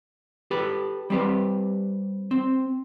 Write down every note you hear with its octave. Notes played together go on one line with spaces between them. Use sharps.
G4 A4 B4
G3 C4 G4 B4
C4